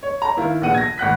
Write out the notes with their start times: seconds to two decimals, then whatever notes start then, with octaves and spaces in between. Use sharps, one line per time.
0.03 C#5
0.22 C#5 A#5
0.37 D#3 E4 F4
0.62 A#1 B3 F#5 D#7
0.74 G#6 A#6
0.98 G#1 F#5 F#6 B6